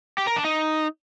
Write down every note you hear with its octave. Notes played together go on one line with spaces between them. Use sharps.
G4
A#4
D4
D#4